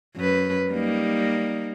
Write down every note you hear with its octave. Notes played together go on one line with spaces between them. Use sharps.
F#2 B4
G3 A#3 D#4